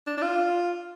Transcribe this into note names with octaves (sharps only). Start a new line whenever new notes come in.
D4
D4
F4